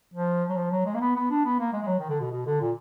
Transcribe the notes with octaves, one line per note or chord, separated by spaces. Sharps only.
F3
F#3
F3
F#3
G#3
A#3
B3
B3
D4
B3
A#3
G#3
G#3
F#3
D#3
D3
B2
B2
D3
A#2